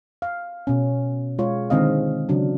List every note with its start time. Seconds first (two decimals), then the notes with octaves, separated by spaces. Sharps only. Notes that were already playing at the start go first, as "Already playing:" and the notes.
0.22 F5
0.67 B2 C#4
1.39 G#3 F4 C#5
1.70 D3 D#3 G#3 C4 D#5 F5
2.29 C#3 F#3 D4